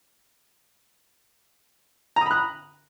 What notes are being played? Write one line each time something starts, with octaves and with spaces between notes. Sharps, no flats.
A#5 B5 D#6 F#6